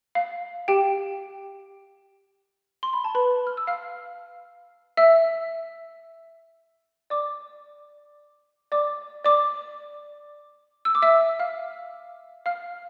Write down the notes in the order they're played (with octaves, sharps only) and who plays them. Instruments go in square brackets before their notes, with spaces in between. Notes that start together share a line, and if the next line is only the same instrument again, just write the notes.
[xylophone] F5
G4 G5
C6
B5
A5
B4 B5
F6
E6
F5 F6
E5 E6
D5 D6
D5 D6
D5 D6
E6
D6
E5 E6
F5 F6
F5 F6